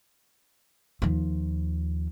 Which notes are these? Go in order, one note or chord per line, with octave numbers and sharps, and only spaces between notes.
D#2 F3